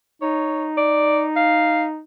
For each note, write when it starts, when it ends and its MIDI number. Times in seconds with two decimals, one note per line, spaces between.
0.22 2.01 63
0.22 0.67 73
0.77 1.24 74
1.36 1.84 77